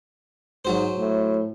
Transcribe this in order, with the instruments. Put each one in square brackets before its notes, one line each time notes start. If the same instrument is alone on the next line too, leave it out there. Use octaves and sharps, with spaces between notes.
[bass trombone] G#2 [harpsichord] F#3 F#4 C5
[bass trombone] A2